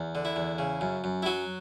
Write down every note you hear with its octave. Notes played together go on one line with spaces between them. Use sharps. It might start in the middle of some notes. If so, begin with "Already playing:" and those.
Already playing: E2
D3
E4
E2
C#3
F#2
F#2
E4
F#3 F#4